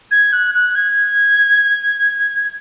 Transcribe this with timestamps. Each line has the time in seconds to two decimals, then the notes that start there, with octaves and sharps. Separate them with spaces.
0.11 G#6
0.33 F#6
0.55 F#6
0.75 G#6